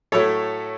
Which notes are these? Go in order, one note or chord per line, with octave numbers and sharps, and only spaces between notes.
A2 F#3 A3 A4 C#5